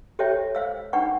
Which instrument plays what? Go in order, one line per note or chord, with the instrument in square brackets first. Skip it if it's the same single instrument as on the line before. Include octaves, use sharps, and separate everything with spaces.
[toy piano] G4 A4 C5 C#5 E5 G5
C5 F5 E6
D4 D#4 B4 F#5 G5 C#6